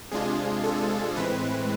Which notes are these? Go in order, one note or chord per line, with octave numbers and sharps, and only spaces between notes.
C3 G#3 D4 F4 G#4
A4
A2 E3 G#3 C4 B4